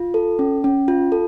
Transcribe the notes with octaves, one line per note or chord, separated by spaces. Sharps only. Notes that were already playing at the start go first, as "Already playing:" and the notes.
Already playing: F4
A4
C#4
C#4
F4
A4